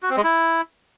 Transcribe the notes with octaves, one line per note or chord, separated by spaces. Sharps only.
F#4
C4
G#3
E4